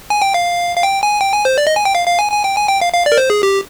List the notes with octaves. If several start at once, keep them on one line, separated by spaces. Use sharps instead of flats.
G#5
G5
F5
F5
G5
G#5
G5
G#5
C5
D5
D#5
G#5
G5
F5
F5
G#5
G#5
G5
G#5
G5
F5
F5
D5
A#4
C5
G#4
G4